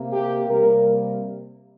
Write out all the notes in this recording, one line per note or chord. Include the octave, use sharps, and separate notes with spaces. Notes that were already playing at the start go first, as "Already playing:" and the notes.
Already playing: C3 A#3
G4
C3 G3 A#3 A#4